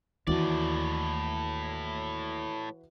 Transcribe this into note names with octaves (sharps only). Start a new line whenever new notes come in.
D#2 A2 E3 F#4 D5